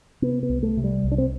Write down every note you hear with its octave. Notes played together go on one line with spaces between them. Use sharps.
C3 B3
B3
C2
A3
C3
G3
C2
D4
C4